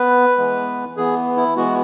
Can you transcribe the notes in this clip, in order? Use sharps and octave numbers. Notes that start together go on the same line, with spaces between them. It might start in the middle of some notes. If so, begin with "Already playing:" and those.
Already playing: B3 B4
E3 G#3 B3
E3 B3 G#4
E4
E3 G#3 B3 F#4